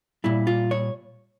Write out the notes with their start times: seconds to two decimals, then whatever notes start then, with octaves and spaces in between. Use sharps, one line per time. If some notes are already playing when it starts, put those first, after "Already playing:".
0.24 A#2 G3 E4
0.47 F4
0.71 C#5